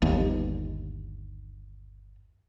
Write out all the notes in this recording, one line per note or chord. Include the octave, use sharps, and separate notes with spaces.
G1 D#2